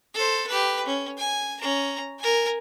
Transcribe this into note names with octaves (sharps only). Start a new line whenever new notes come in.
A4 C5
G4 B4
C#4
G#5
C#4 A#5
A#4 G#5